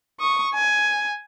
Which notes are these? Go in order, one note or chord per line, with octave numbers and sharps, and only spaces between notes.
C#6 D#6
G#5